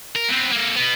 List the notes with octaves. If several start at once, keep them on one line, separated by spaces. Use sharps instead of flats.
A#4
B3 C4
A#3 A4
B2 B3